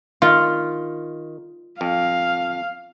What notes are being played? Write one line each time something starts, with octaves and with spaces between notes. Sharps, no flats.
D#3 F4
F2 F5